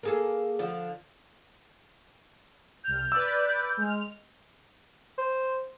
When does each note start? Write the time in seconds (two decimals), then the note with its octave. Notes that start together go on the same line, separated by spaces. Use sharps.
0.03 A#3 G#4 A4
0.59 D3 F3
2.84 C2 F6 G6
3.12 B4 D5 E6
3.77 G#3 F6
5.18 C5